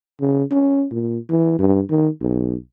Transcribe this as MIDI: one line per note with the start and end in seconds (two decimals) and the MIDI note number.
0.20 0.44 49
0.51 0.85 61
0.91 1.18 46
1.29 1.56 52
1.59 1.81 43
1.90 2.08 51
2.20 2.55 35